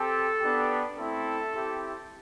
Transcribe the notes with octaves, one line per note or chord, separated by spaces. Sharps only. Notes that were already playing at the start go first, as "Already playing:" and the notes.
Already playing: C4 G4 A4
B3 D4 G4
A3 C4 E4 A4
C4 E4 G4